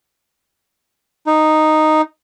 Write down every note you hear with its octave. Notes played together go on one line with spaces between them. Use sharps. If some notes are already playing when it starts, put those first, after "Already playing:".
D#4